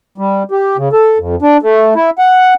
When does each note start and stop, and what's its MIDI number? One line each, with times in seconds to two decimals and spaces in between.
0.18 0.43 55
0.51 0.77 67
0.77 0.89 49
0.93 1.18 69
1.18 1.35 41
1.42 1.57 62
1.62 1.94 57
1.96 2.10 64
2.18 2.54 78